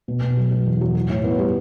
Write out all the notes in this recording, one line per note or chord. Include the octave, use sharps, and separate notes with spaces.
B2
B2
F#3
F#3
E2
F#3
F#4
A2
B3
G3